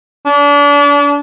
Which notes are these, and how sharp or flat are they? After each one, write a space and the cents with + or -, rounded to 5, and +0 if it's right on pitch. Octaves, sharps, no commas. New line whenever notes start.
D4 -35